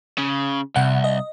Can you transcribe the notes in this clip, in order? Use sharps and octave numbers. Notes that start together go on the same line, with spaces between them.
C#3
C2 C3 F#5
D#5